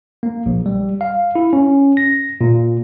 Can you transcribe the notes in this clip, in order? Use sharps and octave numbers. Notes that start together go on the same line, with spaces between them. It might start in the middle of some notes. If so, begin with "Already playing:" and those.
A#3
A#1
G3
F5
E4
C#4
A#6
A#2